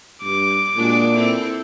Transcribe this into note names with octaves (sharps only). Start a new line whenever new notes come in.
G2 D6
A#2 G#3 D4 F#4
C4 E4 A4